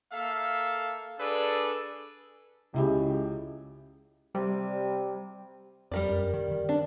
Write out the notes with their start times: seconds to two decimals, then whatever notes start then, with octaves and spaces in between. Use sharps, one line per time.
0.12 A#3 A4 E5 F5
1.19 D4 G#4 A4 B4 D5
2.74 C#2 C#3 G#3 E4 G4
4.35 C3 G3
5.91 F2 G3 A#4 D5
6.08 F#2
6.33 D#3
6.51 D#3
6.69 D4